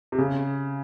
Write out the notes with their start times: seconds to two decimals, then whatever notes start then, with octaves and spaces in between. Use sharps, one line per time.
0.12 C3
0.18 C#3